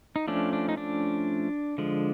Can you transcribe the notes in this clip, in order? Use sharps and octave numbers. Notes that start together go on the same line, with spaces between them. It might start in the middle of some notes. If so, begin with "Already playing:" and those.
D#4
F3 A3 C#4 D4
D4
D#4
D4
D3 F3 G#3